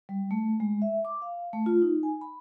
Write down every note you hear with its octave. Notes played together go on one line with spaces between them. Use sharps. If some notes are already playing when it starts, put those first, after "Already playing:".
G3
A3
G#3
E5
D6
F5
A3
F4
D#4
G#5
B5